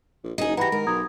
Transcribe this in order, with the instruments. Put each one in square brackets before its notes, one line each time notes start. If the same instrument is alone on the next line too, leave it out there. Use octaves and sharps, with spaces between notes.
[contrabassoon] A#1
[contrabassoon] F#1 [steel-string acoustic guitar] D#4 G#4 [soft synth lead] D#5
[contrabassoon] E3 [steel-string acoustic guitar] F#4 G4 [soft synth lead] B4 [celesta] A#5 B5 A#6
[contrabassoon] D#3 [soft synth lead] G#3 [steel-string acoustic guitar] A#4
[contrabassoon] B1 [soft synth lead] A#5 [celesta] D#6 G#6